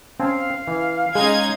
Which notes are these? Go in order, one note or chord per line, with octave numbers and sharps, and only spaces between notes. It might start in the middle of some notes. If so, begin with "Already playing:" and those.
C4 C#4 F5 G#5 A5
E3
G#3 C#4 D#4 G#4 G#6